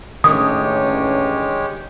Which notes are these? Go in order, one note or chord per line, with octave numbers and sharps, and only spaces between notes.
A1 D#3 G#3 C#4 D4 G4 C#5 D#6